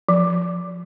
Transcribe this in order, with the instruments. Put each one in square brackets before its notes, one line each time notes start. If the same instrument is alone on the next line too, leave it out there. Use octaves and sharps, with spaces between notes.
[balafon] F3